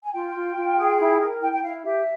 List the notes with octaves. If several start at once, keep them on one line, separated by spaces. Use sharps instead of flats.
G#5
F4 G5
F4
F4
G#4
E4
A#4
E4 G5
G5
E4 F5
G4 E5